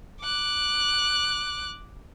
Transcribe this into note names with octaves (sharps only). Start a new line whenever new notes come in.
D6 F#6